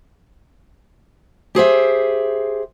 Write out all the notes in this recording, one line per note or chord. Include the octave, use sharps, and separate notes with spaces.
G4 G#4 C5 E5